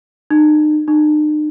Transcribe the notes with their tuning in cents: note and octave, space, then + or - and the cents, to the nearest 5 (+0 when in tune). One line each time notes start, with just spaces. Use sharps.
D#4 -40
D#4 -45